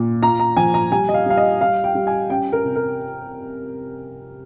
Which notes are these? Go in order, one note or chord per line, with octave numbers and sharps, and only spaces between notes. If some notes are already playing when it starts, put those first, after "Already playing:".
Already playing: A#2
F4 A#5
A#5
F3 G#5
A#5
G3 G#5
D#5
F5
G3 F5
D#5
G3 F5
G5
G3
G#5
C#4 G5
A#4
C3
A#4